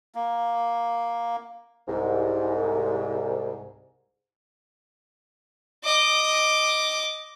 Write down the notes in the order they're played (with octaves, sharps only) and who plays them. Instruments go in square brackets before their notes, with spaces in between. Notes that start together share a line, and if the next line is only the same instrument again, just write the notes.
[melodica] A#3
[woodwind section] C2 G#2
[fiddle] D#5 D6